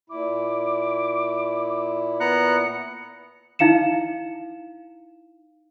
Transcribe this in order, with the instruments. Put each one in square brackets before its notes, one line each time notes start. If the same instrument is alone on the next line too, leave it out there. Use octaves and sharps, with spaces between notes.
[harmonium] A#2 E4 [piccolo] D6
[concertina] B3 A#5 F#6 [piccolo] C#7
[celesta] D#4 E4 F5 C#7 E7